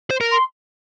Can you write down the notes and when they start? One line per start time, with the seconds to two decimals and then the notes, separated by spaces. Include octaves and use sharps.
0.11 C5
0.21 A#4
0.31 C6